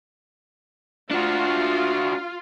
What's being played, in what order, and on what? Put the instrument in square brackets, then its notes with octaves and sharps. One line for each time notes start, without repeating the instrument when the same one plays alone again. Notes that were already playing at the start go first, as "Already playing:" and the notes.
[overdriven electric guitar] D4 F#4 [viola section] F4